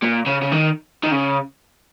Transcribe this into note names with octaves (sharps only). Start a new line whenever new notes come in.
A#2
C#3
C#3
D#3
D#3
C#3